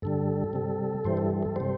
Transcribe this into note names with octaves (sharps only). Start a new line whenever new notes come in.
G2 D3 G3 A4
C3 G3
G2 E3 G3 C5
A4
A4
C3 G3 C5